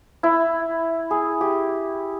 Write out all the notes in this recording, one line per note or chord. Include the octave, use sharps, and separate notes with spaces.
E4
G#4
G4